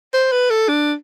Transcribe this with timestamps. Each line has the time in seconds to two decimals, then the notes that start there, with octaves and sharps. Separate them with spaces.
0.14 C5
0.32 B4
0.50 A4
0.68 D4